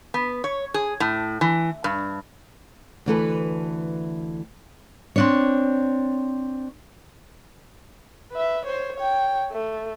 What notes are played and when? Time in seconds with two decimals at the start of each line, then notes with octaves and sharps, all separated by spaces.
0.14 B3
0.44 C#5
0.74 G#4
1.00 A2
1.41 E3
1.84 G2
3.06 D2 E3 A4 B4
5.16 C4 D4 C#5
8.32 B4 E5
8.65 C5 C#5
8.96 C#5 G5
9.52 A3